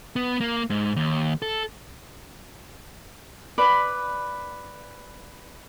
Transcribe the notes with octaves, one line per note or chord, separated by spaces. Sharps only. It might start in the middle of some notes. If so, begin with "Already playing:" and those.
B3
A#3
G#2
D#2
A4
B4 D5 B5